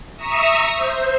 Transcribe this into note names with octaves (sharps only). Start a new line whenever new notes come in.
E5 A#5 C#6 D#6 E6
C5